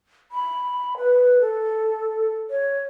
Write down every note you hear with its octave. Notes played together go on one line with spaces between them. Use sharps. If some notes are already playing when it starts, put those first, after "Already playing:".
B5
B4
A4
C#5